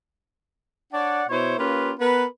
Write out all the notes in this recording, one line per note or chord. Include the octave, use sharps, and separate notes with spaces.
D4 C#5 D5 F#5
B2 E4 C5 C#5
A#3 C#4 F4 G4 B4
B3 A#4 B4